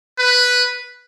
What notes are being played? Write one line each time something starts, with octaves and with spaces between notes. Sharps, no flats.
B4